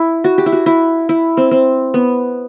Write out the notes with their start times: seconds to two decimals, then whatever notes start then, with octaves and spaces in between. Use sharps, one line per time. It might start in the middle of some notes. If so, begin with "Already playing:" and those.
Already playing: E4
0.24 F#4
0.38 G4
0.46 E4
0.52 F#4
0.66 E4
1.09 E4
1.37 C4
1.51 C4
1.94 B3